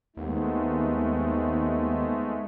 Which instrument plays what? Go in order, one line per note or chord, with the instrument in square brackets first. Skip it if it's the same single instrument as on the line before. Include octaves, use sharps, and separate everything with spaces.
[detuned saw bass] D#2 [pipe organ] G#3 A3 [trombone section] B3 C4 D#4